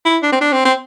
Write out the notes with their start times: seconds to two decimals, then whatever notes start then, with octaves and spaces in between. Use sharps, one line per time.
0.05 E4
0.23 D4
0.32 C4
0.41 D4
0.53 C4
0.65 C4